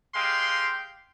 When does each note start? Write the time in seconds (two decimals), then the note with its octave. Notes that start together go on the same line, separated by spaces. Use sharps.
0.15 G#3 G4 F5 G5 C6